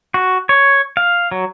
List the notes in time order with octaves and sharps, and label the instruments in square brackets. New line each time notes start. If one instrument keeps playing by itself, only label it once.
[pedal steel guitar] F#4
C#5
F5
F#3